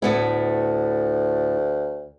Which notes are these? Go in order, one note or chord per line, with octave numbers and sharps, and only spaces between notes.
D2 A2 B3 E4